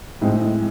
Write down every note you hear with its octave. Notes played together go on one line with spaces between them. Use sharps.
A2 G#3 C4